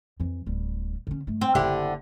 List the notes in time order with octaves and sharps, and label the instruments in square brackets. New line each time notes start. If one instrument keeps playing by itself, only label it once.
[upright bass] F2 E3
D1 G3
D3 C#4
G2 A3
[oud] C4
[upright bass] F#1 C#2 [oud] D3 E4 G4